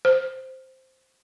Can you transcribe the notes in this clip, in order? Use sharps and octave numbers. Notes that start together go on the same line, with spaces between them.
C5